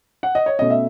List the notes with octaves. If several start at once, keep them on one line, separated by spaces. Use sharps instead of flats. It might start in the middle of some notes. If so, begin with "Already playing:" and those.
F#5
D#5
C#5
B2 A3 C#4 D#5
E5